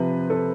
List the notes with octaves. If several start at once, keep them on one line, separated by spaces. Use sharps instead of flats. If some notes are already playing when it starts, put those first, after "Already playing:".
Already playing: C3 F3 B4
A4